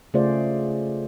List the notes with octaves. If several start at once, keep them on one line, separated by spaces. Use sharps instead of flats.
C#3 A3 F4 G#4 C5 D5